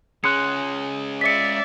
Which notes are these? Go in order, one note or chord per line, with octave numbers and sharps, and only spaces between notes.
G#3 C#4 G#4 C6 F#6 C#7
D5 E5 B6 C#7